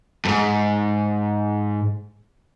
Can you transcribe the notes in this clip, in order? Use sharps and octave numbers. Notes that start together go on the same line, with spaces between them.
F2 G#2